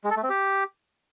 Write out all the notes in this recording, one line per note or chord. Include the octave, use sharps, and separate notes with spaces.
G#3
A4
A3
C4
G4